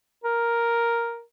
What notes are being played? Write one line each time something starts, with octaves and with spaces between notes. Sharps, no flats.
A#4